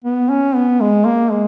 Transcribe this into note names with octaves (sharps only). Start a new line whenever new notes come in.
B3
C#4
B3
G#3
A#3
G#3